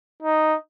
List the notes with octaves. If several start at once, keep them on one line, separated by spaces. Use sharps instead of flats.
D#4